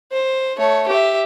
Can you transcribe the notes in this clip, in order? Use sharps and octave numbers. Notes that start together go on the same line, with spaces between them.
C5
A3 C#5
G4 E5